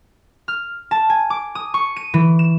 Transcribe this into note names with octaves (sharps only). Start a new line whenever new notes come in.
F6
A5
G#5
D6
D#6
C#6
D#7
E3
E7